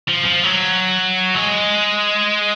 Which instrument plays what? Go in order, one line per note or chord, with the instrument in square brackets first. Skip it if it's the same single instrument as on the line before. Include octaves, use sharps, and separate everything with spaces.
[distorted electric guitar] F3
F3
F#3
G#3